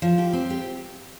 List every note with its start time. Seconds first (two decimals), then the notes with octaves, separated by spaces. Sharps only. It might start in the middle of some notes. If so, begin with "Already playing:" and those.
0.02 F3
0.18 G4
0.33 C4
0.50 G4